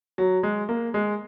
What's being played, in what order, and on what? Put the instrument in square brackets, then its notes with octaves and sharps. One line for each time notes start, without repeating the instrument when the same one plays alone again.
[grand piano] F#3
G#3
A#3
G#3